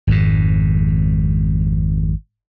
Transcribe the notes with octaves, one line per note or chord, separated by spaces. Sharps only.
G#1 F2 G#2